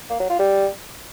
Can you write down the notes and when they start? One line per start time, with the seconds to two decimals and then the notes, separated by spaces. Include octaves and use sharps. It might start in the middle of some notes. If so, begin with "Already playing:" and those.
0.10 A#3
0.20 F#3
0.30 F4
0.39 G3